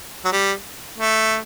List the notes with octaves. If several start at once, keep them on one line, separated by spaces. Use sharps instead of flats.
F#3
G3
A3